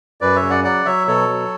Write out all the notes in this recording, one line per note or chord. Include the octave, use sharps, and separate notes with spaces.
F#2 B4 D5
C#5 E5
C#3
D5 F#5
F#3 D5 F#5
F#3 C#5 E5
B2 A4 C#5
F#3